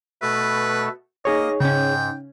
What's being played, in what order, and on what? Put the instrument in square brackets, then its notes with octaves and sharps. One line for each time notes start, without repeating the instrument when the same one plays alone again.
[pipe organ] B2 A3 A4 [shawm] B4
[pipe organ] A#3 A#6 [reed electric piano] D#4 G#4 C#5 [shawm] D#5
[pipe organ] G#2 [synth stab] C#3 C#4 [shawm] G5